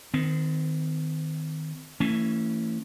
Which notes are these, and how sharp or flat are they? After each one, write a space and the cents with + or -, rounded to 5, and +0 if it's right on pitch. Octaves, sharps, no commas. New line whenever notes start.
D#3 +5 C4 -35
E3 +0 A3 +40 C#4 +0